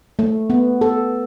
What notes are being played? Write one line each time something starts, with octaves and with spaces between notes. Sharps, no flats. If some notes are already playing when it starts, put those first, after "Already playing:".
A3
B3
A4